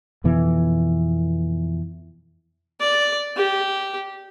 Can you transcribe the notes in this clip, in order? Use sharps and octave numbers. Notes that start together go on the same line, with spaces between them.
F2 B2 E3 B3
D5
G4